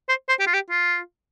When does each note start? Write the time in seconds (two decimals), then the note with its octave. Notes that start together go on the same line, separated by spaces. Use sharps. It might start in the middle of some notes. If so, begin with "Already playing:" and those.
0.09 C5
0.29 C5
0.40 G4
0.47 F4
0.54 G4
0.70 F4